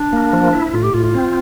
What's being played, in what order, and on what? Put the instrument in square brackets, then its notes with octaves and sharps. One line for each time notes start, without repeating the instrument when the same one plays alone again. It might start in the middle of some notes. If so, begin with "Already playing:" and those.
Already playing: [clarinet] D4
[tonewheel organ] A#3
F3
E4
[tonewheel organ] A2 [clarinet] F4
[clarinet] G4
[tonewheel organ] A2 [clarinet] F4
[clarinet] F4
[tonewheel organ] C4